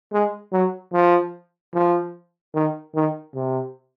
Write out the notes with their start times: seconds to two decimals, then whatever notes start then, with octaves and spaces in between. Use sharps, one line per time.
0.12 G#3
0.52 F#3
0.93 F3
1.74 F3
2.54 D#3
2.95 D#3
3.35 C3